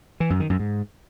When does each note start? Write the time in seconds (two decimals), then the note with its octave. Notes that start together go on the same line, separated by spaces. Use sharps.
0.20 E3
0.30 F#2
0.40 D#3
0.50 F#2
0.59 G#2